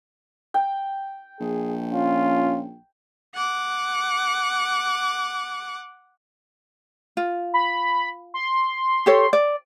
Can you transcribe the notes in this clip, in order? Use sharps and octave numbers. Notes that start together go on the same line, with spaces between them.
G5
A#1 G#4
C#4 F4
F#5 D6
F4
B5
C6
G4 A4 C#5
D5